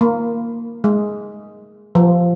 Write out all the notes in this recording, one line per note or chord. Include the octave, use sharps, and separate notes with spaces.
A#3
G#3
F3